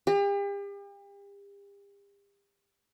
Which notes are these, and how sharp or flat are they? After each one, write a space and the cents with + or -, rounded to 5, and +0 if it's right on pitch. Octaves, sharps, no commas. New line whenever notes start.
G4 +40